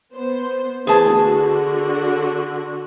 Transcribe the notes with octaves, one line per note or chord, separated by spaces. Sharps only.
B3 C5
E3 A3 G#4 A5
D3 F#4